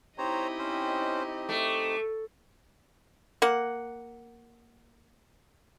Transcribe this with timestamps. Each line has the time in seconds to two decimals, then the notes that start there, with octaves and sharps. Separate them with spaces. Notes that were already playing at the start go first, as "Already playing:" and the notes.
0.18 C4 D#4 E4 G4 C5 C#5 D#5 A#5
0.58 C#4 C5
1.49 A3 D6
3.42 A#3 F#5